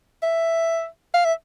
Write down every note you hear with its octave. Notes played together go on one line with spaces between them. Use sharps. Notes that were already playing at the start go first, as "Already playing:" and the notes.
E5
F5
E5